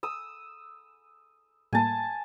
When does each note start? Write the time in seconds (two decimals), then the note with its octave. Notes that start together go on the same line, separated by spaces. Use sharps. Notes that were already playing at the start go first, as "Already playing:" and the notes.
0.03 D#6 E6
1.73 A2 G3 A#3 G#5 A5